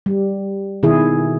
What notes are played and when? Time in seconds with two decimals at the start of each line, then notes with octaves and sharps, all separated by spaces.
0.06 G3
0.83 B2 D#3 E4 G#4